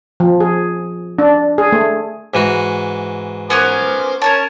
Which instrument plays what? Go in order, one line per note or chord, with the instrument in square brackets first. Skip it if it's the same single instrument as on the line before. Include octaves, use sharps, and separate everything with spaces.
[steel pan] F3
G#4
D4
G#4
A3
[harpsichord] G#2 E3 F#4
[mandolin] B3 C#4 A#4 [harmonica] C5 G#5 D6
[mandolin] C#4 A#4 A5 [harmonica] C#5